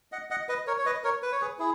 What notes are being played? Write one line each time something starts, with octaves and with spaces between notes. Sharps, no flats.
D#5 F#5
D#5 F#5
B4 D#5
A#4 C#5
C#5
B4 D#5
A#4 C#5
B4
C#5
G#4 B4
E4 G#4